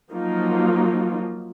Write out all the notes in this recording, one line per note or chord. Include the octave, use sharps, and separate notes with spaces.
F3 F#3 A#3 D#4 F4